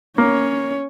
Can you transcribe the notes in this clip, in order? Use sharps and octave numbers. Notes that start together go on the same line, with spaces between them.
A#3 C#4 C#5